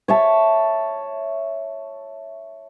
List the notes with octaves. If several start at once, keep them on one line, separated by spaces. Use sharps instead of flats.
C#5 E5 A5